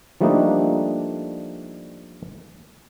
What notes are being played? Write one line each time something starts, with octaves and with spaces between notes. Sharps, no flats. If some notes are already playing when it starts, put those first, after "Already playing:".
F3 G3 A3 A#3 D4 D#4